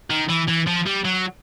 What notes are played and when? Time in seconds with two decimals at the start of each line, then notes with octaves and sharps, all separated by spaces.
0.10 D#3
0.29 E3
0.48 E3
0.67 F3
0.86 G3
1.05 F#3